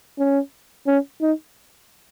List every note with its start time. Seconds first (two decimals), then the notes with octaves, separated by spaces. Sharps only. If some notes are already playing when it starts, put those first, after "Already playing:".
0.19 C#4
0.87 C#4
1.21 D#4